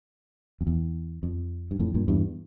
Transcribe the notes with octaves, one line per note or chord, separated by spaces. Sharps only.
F2
E2
F2
G2
F2 A2
G2 A#2
E2 G2